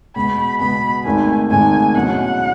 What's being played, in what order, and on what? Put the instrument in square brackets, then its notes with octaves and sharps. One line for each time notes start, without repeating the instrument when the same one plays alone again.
[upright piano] B2 G#3 B3 [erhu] B5
[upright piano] B2 G#3 B3 [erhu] B5
[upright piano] G#1 G#2 D#3 A3 [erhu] G#5
[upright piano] G#1 G#2 D#3 A3 [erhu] G#5
[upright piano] B2 F#3 C#4 E4 G#4 [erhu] F#5